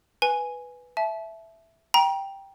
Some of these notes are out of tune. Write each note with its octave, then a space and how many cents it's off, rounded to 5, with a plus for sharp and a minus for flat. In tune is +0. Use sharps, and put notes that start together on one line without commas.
B4 +0 G#5 +0
E5 +0 A5 -35
G5 +0 A#5 +30